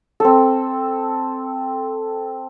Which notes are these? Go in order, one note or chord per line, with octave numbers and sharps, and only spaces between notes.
C4 A4